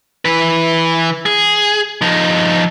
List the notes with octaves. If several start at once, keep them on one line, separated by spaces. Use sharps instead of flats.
E3 B4
G#4
F3 D#4